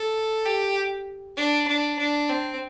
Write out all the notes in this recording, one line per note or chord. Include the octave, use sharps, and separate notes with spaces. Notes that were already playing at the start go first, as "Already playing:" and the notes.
Already playing: A4
G4
D4
D4
D4
C4